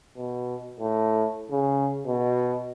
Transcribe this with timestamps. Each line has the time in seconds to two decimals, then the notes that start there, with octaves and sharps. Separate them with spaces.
0.17 B2
0.80 A2
1.51 C#3
2.07 B2